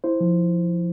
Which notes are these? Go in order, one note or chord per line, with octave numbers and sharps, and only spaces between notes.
E4 C5
F3